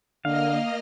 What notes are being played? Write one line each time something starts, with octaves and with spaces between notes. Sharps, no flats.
D3 A#3 D#5 F5 F6